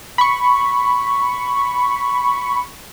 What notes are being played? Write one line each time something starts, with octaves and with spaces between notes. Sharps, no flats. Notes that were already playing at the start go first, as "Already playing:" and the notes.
B5 C#6